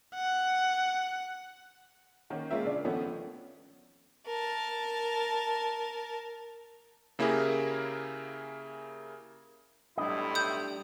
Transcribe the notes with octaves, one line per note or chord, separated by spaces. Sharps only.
F#5
D#3 A#3 C#4
G#3 A#3 C#4 F4 A#4 E5
C#3 D4
D#3 F3 A3 B3 C#4
A#4 A5
C#3 A#3 E4 G4 G#4 A#4
B1 A2 G3 D4 E4 D#5
D#6 G6